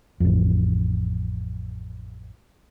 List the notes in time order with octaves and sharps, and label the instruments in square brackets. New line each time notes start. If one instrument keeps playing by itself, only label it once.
[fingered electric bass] A1 F2